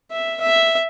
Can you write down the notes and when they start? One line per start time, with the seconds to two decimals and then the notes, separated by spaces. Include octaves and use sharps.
0.11 E5
0.41 E5